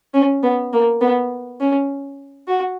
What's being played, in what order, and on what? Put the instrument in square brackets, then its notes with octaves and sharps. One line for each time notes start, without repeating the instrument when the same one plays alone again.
[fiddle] C#4
B3
A#3
B3
C#4
F#4